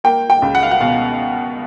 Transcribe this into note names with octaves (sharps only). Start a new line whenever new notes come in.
A#3 G5
G5
C#2
F#5
F5
F#5
B2 F5